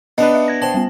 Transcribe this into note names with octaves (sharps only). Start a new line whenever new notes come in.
B3 D4 D#4 B4 D#5
E5
G#6 A#6
C5 G5 A5 C6
G3 B3